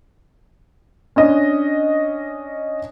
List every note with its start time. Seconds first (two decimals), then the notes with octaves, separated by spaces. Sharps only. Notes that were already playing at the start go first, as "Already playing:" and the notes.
1.16 C#4 D4 D#5